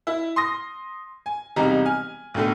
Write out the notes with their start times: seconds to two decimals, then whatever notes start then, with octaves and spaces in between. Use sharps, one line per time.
0.07 E4
0.36 C6 D#6 A#6
1.26 G#5
1.56 E1 C3 G3 D#4 A#5
1.85 G#5 F6
2.34 B1 A2 D3 A3